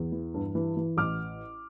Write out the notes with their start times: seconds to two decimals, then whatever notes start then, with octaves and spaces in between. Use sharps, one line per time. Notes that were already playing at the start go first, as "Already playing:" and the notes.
Already playing: E2
0.12 E3
0.34 G2
0.55 E3
0.77 E3
0.97 A1 D6 F6